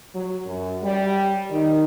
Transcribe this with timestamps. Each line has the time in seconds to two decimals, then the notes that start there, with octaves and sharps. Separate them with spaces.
0.15 F#3
0.46 F#2
0.83 G3
1.50 D#3